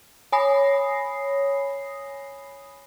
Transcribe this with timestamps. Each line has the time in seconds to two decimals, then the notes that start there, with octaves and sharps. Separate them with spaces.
0.32 C#5 G#5 B5 D#6 A#6 C7